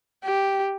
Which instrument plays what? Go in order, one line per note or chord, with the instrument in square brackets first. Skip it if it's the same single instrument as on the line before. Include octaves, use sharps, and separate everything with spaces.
[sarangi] G4